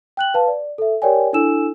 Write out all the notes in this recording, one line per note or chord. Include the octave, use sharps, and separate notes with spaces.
G5 F#6 F#7
B4 F5 A5
D5
A4 E5
G4 A#4 C#5 D5 G5 G#5
D4 E4 A4 G#5 E6 E7